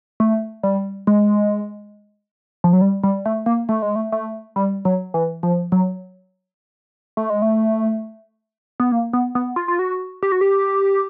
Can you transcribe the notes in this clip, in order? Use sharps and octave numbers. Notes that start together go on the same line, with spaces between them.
A3
G3
G#3
F3
F#3
G3
G3
A3
A#3
A3
G#3
A3
A3
G3
F#3
E3
F3
F#3
A3
G#3
A3
B3
A#3
B3
B3
F4
F4
F#4
G4
F#4
G4